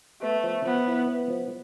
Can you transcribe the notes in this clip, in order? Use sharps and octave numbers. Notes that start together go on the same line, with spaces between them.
A3 B3
F3
F3 B3
E4
B3
F3